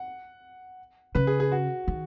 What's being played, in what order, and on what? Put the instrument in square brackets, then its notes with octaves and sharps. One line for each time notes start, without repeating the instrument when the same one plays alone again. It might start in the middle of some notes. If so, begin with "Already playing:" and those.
Already playing: [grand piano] F#5
[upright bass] C#3 [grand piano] B4
[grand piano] G#4
G#4
F#4
[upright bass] D#3